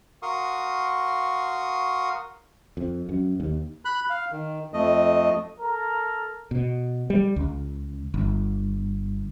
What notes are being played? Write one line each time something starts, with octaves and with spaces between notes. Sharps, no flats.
F#4 A#4 F5 C6 C#6 D#6
F2
F#2
D#2
B5 F#6
F5
D#3
F2 A3 D#5
A4 A#4 A#5
B2
G3
C#2
G1